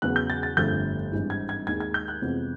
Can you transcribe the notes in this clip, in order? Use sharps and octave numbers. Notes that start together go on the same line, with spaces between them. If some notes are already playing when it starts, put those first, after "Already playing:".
E2 C#3 F#3 B3 F#6
G6
A6
A6
G1 F2 D3 F3 A3 G6
G#1 G2 E3
G#6
G#6
D#2 D#3 G#3 G#6
G#6
G6
F#6
F2 C3 E3 G#3 B3